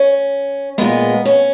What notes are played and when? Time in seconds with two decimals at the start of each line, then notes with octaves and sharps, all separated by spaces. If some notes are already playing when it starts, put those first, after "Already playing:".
Already playing: C#4
0.78 A#2 G#3 B3
1.25 C#4